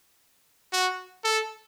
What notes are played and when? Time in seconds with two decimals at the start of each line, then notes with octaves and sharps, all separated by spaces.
0.73 F#4
1.24 A4